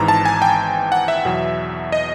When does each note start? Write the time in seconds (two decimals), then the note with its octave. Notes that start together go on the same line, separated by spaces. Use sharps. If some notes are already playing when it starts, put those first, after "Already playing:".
Already playing: G#1 G#2 E3 A#5
0.08 A5
0.25 G#5
0.42 G5
0.92 F#5
1.08 E5
1.25 E2 B2 F#3
1.92 D#5